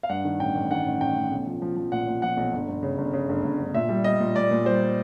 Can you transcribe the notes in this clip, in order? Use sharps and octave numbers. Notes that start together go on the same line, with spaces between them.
F5
G2 F#5
D#3
A1 G5
A1
D#3 F#5
A1
A1 G5
A1
B1
F3
F3
F3
A#2 F#5
A#2
F3 F#5
B1
G1
G1
C#3
G1
C#3
G1
G1
G1
A#2 E5
G3
G3 D#5
A#2
A#2 D5
A#2
G3 C5